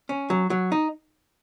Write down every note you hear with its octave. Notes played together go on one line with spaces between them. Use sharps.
C#4
F#3
F#3
D#4